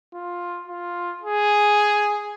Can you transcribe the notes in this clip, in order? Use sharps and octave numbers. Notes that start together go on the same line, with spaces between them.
F4
F4
G#4